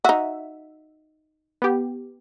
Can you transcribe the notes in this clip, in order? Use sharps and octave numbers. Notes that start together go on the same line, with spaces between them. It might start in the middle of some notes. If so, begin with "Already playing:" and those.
D#4 F#4 E5
B3 G4